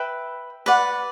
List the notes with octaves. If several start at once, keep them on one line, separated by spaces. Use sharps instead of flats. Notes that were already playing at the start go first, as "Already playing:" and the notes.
Already playing: B4 E5 G5 B5
B4 D5 F#5